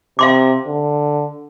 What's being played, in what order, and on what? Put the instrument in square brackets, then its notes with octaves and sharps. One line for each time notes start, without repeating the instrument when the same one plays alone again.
[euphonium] C3 [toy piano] F5 C6 D6
[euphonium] D3